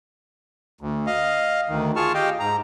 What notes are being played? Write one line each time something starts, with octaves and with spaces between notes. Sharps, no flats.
D2
D#5 F5
D2 D#3
F4 G#4 A5 C#6 F6
G4 D#5 F5 G5
G#2 A#5